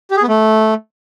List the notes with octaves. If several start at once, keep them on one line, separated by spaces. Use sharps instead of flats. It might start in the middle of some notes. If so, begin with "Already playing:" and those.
G4
G#4
B3
A3